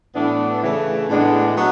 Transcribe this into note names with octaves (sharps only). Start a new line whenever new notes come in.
A2 E3 B3 D4
C#3 E3 A3
A2 G#3 B3 D4
F#3 B3